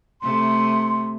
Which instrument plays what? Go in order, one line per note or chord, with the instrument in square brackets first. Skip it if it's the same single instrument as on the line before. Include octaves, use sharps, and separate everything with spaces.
[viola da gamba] C3 A3 [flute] C6